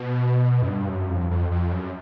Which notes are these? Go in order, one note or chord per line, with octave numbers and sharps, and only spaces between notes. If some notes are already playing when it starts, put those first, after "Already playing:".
Already playing: B2
F#2
G2
F#2
F2
F2
F2
F#2